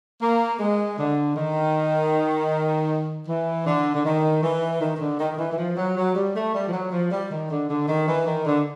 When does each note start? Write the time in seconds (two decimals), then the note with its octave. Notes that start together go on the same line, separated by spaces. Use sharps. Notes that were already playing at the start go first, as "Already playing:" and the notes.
0.20 A#3
0.58 G#3
0.97 D3
1.35 D#3
3.27 E3
3.65 D3
3.94 D3
4.04 D#3
4.42 E3
4.80 D#3
4.95 D#3
4.99 D3
5.18 D#3
5.31 D#3
5.38 E3
5.50 E3
5.57 F3
5.76 F#3
5.95 F#3
6.14 G3
6.33 A3
6.53 G3
6.67 F3
6.72 F#3
6.91 F3
7.11 G3
7.29 D#3
7.49 D3
7.68 D3
7.87 D#3
8.06 E3
8.26 D#3
8.45 D3